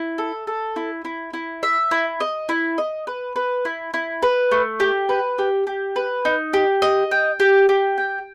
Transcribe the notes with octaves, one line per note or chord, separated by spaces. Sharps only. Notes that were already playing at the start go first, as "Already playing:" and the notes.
Already playing: E4
A4
A4
E4
E4
E4
E5
E4
D#5
E4
D#5
B4
B4
E4
E4
B4
A3
G4
B4
G4
G4
B4
D#4
G4
D#5
G5
G4
G4
G5